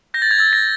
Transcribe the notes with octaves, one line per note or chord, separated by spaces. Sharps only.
G6 A#6
A6
G#6
E6 A6
A#6